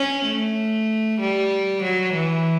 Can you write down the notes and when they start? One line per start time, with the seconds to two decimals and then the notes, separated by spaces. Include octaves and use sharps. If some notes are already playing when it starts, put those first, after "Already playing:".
Already playing: C#4
0.25 A3
1.20 G3
1.83 F#3
2.14 E3